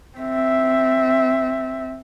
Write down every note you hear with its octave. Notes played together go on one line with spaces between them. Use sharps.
C4 E5